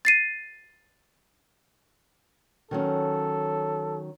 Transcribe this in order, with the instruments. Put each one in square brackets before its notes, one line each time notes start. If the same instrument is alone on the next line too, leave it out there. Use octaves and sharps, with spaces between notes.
[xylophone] A6 C7 D#7
[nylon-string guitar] D#3 F#3 C#4 [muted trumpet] A4